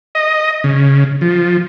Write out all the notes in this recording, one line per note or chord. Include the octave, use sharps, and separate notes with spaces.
D#5
C#3
F3